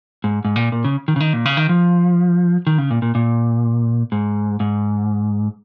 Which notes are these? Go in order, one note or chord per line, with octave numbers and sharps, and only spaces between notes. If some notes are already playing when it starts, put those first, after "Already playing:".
G#2
G#2
A#2
A#2
C#3
D#3
C#3
D#3
A#2
C#3
D#3
F3
D#3
C#3
A#2
A#2
A#2
G#2
G#2